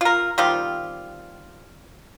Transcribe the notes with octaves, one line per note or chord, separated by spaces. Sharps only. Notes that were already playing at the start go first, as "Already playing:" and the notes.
F4 A#4
D#3 G3 C4 F4